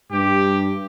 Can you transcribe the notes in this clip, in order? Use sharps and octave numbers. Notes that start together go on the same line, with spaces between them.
G2 G4